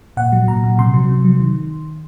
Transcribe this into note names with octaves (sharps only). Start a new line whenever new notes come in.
A#2 F#5
F#3
A#2 A#5
A#2
C3 C6
F#3
C3
F#3
D#3